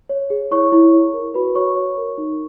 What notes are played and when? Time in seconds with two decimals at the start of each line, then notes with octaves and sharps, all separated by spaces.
0.09 C#5
0.30 G#4
0.51 E4 C#5 C#6
0.72 E4
0.93 C#5
1.14 A#4
1.34 F#4 B4 B5
1.55 F#4 C#5 C#6
1.76 C#5
1.97 A#4
2.18 D#4